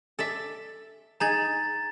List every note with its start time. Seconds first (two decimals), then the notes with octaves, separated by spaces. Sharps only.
0.19 A4 D5 E5
1.20 D#4 G#4 A#5 A6